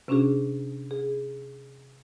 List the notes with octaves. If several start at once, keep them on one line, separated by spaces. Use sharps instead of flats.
C3 C#4 D4 F#4 G#4
G#4